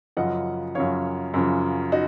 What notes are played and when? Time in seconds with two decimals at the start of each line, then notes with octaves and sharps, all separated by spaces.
0.17 F#2 C#3 F3 D#5 F#5
0.75 F#2 C#3 F3 C#5 F5
1.34 F#2 C#3 F3
1.92 D#4 F#4